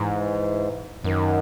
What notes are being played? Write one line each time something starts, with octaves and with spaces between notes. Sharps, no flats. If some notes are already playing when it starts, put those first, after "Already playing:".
Already playing: G#2 E3
F#2 D#3